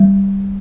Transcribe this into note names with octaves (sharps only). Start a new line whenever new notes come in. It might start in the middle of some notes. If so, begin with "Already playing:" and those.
Already playing: G3